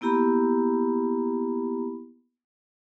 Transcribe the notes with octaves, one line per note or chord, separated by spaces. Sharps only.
A#3 B3 E4 G4 A#5 B5